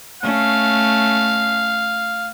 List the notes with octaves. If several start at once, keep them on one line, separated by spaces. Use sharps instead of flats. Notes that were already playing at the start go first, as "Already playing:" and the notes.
A3 C#4 F5